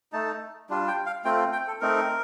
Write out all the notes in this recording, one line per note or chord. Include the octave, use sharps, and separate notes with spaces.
A3 D#4 A5
G3 D4 F4
G5
F5
A3 C4 F4 G5
G5
A4
A3 C4 D#4 A#4